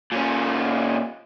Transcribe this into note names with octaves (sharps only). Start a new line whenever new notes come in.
A#2 C#4